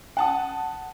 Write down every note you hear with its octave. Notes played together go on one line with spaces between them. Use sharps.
F#5 A5 D#6